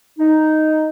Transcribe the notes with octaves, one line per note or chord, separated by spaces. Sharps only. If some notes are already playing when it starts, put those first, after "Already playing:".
D#4